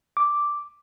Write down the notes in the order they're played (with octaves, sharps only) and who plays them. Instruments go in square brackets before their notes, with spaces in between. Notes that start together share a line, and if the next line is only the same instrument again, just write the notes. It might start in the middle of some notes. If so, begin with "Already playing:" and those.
[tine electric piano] D6